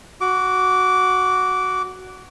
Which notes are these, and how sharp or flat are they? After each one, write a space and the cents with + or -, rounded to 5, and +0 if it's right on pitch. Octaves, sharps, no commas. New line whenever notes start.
F#4 +0 D6 -20